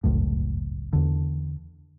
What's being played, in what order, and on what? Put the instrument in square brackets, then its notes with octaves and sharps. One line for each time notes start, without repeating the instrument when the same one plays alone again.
[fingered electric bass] G1 C#2 F#2 A2
E2 D3